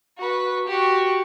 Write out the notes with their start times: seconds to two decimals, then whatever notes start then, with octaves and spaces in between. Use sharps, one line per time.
0.18 F#4 B4
0.68 F#4 G4